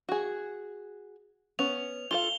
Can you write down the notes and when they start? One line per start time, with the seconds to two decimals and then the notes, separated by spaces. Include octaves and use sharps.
0.09 F#4 G#4
1.59 B3 C#4 F7
2.11 F4 A4 F5 G7